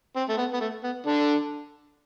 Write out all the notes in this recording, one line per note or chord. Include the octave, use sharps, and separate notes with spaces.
C4
A3
B3
B3
A3
B3
D3 D4